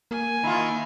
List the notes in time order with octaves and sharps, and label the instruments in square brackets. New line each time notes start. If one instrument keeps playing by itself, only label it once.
[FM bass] A#3 [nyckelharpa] G#5
[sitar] D#3 F4 [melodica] E4